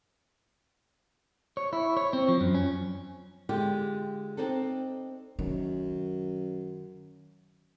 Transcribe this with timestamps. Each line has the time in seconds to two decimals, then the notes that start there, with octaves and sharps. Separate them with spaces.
1.57 C#5
1.73 E4
1.97 C#5
2.13 C4
2.28 F3
2.41 F#2
2.55 C#4
3.49 D3 G#3 F4 G4
4.37 C4 D4 D#4 A4
5.39 F#2 D#3